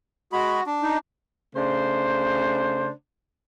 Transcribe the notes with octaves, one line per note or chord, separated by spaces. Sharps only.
G#3 F#4 B5
D4
D#4
C#3 A3 D4 C5